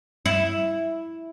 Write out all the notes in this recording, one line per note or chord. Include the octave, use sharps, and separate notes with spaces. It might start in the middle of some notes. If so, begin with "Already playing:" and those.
E4